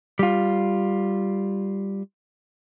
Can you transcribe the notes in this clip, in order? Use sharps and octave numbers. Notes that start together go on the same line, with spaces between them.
G3 F4